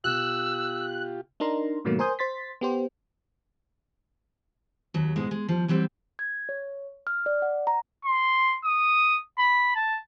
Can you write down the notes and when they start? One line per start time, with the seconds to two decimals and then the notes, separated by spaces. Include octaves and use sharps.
0.04 B2 B3 F4 G4 E6 F#6
1.40 D4 D#4 A#4 A#5 C6
1.85 G#2 B2 D#3 F#3 A3 A#3
1.99 A#4 C5 G#5 C6 D#6 G6
2.19 C5 C6 A6 B6
2.61 B3 G4 C5
4.94 D#2 F#3
5.16 G#2 B2 E3 G#3
5.31 G#3
5.49 F3 G3
5.68 E3 F#3 G3 C4
6.19 G#6
6.49 C#5
7.07 F6
7.26 D5
7.42 F#5
7.67 A#5
8.05 C6
8.64 D#6
9.38 B5
9.75 A5